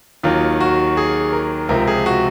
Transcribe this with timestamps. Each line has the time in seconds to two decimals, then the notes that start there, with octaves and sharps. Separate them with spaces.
0.23 D#2 D#3 F#3 F4
0.60 F#4
0.97 G#4
1.33 A#4
1.69 C#2 C3 F3 A#4
1.87 G#4
2.06 F#4